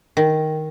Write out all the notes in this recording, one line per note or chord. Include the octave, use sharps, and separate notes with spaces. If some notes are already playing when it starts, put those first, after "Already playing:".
D#3